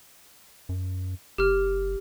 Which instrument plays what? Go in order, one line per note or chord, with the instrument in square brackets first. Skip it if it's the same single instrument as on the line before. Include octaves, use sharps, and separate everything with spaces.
[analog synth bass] F#2
[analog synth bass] F#1 [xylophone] G4 F6